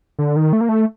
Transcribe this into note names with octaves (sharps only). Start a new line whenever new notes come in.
D3
D#3
A3
A#3
A3